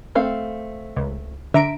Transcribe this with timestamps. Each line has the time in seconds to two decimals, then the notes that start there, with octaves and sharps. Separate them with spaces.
0.15 A3 C4 F5
0.96 C#2
1.54 D3 E5 A#5 D7